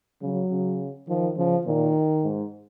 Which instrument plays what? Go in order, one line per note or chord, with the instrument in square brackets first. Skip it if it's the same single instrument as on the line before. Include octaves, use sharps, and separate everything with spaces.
[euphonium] C#3 [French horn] F#3
[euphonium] C#3
[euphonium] D#3 [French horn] F3
[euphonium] C#3 [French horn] F3
[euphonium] A#2 [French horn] D#3
[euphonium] G#2